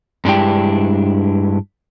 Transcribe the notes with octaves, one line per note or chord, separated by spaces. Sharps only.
G2 G#3 D4 E4 G4 G5